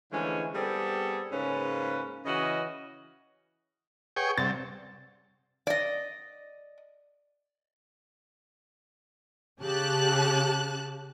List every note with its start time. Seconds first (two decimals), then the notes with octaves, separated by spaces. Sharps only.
0.12 D3 E3 F3 G#3 A3 C#4
0.55 G3 B3 C4 G#4 A4 D5
1.32 G#2 C#3 A#3 C#4 B4
2.25 C#3 E3 C#4 F#4 D#5
4.16 G#4 B4 C#5 F#5 G5 C#6
4.38 C3 G3 D5 F#5 A6
5.67 D5 D#5
9.62 C#3 G4 A5 F#6